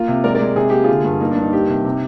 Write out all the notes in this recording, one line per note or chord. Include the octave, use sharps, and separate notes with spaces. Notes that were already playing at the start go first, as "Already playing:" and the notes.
Already playing: A#3 F4
C3
G#3 A#4 D5
A#4 D5
G#3
C3 G#4
A#3 G4
D3 F4 G#4
G2
A#3 D#4
D4
G2
D#4
A#3 D#4 G4
C3
C3